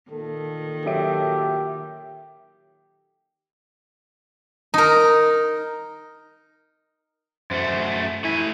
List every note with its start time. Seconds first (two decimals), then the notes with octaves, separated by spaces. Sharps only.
0.11 A#2 D#3 A#3 A4
0.86 F#3 G4 E5 D7
4.74 D#4 A#4
7.51 F#2 A3 C5
8.24 A3 E4 G#5